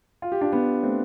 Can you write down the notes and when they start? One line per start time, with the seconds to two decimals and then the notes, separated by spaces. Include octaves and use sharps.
0.22 F4
0.32 G4
0.41 D4 F4
0.52 B3 D4
0.83 A3 C4